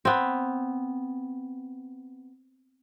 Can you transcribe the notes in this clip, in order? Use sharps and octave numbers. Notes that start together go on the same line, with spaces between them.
B3 C4